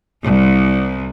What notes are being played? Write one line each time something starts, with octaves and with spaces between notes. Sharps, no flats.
C2